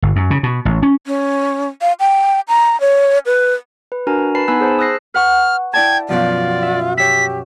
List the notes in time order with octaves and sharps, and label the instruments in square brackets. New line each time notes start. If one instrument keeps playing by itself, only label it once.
[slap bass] G1
F#2
C#3
B2
A1
C#4
[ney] C#4
F5
G5
A#5
C#5
B4
[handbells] B4
D4 F#4 A#4 G#5 A#5
B4 A5 B5 C7
B3 D#4 G#5 B5 E6 F#6
G#4 C5 A5
D#6 E6 F#6 A#6 C7
[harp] B4 F#5 C#6 [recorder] F6
[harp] E4 D5 A5 [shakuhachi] G5 [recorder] G#6
[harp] F#2 B2 F3 [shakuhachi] F4 [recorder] D5
[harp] E5
[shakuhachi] G4 [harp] C#5 E6 [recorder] B6